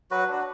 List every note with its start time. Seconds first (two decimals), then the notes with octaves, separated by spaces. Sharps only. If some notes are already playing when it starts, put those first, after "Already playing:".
0.11 F#3 F#4 B4
0.27 D4
0.33 F#4